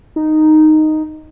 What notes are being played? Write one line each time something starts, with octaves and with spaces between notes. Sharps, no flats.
D#4